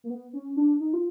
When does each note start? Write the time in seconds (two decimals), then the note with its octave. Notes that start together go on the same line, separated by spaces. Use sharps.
0.04 A#3
0.10 B3
0.33 C#4
0.56 D4
0.80 D#4
0.93 F4